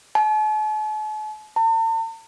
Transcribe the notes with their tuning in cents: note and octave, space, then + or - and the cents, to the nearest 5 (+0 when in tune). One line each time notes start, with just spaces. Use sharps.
A5 -45
A5 +45